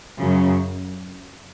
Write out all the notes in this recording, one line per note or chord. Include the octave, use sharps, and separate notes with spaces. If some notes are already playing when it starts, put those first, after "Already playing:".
F#2 C#3 F#3